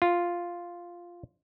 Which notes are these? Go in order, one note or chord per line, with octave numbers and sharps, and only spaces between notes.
F4